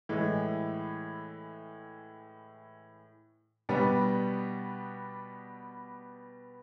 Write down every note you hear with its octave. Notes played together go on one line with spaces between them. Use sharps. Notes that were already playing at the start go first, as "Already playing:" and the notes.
A2 E3 G#3
B2 G3 B3 D4